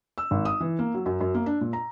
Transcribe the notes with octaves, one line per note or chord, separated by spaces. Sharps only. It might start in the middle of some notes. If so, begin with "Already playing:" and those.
E6
G#1
D#6
E3
A#3
F#3
F#2
F#2
A#3
D4
A#2
A#5